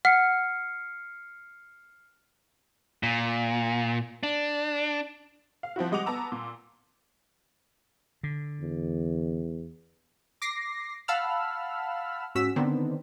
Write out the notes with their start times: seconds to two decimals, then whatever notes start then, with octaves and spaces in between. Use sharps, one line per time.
0.05 F#5 F6 C7 C#7
3.03 A#2
4.23 D4
5.63 F5
5.76 F3 C4 E4 F#4
5.91 G3 G#3 D#5 F#5 D6 F7
6.06 B3 A5 A#5 E6
6.32 A#2
8.23 D3
8.60 E2
10.42 D6 A#6 C7
11.08 F5 F#5 A5 B5 E6 F6
12.35 G#2 C#4 F#4 E6 B6
12.56 D3 D#3 B3 C4 D4